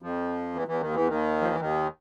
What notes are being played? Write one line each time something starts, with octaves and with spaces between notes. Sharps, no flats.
F2 F3
E2 E3
E2 E3
D#2 D#3
E2 E3
D#2 D#3
F3
E3
D#2 D#3